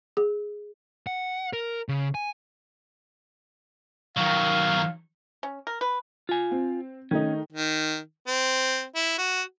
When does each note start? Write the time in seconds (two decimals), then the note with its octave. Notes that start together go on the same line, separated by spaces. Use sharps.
0.17 G#4
1.07 F#5
1.53 A#4
1.89 C#3
2.15 G#5
4.17 D#3 F#3 F5
5.43 C#4
5.67 A#4
5.81 B4
6.29 F4 G#5
6.51 C4
7.11 D#3 A3 C#4 D#4
7.52 D#3
8.27 C4
8.95 E4
9.18 F#4